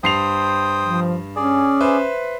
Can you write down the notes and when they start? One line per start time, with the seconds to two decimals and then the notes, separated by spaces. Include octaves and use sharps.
0.03 G2 C5 G5 D#6 C7 F7
0.83 F3
1.36 C#4 G#4 D5
1.80 B4 C5 E5